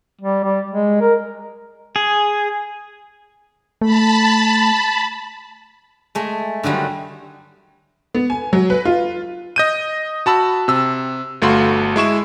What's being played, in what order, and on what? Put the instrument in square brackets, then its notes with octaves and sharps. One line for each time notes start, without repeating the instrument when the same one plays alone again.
[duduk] G3
G3
G#3
A#4
[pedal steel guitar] G#4
[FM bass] A3 [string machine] A5 B5
[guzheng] G#3 A3
D3 D#3 F#3 G3
[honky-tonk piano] B3
G#5
F#3
B4
F4
[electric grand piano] D#5 G6 D#7
F#4 A5 B5 E6
C3 E6
G1 A3 F#4 F5 B5 C6
G#3 E4 C#6 E7